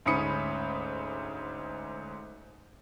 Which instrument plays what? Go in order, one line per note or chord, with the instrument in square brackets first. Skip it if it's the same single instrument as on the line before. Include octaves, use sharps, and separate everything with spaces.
[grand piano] D2 G#2 C#4 B5 D#6 C#7